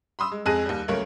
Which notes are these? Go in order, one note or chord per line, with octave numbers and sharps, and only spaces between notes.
B5 C6 D#6 E6
G#3
F2 G#3 G#4 F#6 A#6 D#7
D#2 G3
C#2 F#3 A3 A#3 A#4 C#5